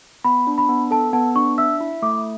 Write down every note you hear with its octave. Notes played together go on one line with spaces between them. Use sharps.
B3 B5
D4
B5
B3
A4 A5
B3 A5
D4 C#6
E5 E6
E4
A3 D6